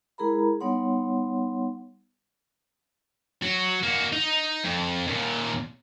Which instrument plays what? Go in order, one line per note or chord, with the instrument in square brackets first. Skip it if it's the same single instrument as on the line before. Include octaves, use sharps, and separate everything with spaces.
[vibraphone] G#3 E4 G#4 A#4 A#5 B5
G3 B3 D#4 C#5 F#5 C6
[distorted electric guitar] F#3 F#4
A#3 F#4
D#4
F2
D#2 A#2